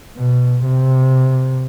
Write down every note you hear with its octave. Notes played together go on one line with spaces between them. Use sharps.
B2
C3